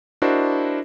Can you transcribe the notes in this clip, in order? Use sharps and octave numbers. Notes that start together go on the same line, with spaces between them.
D4 E4 F#4 A#4 C5 D#5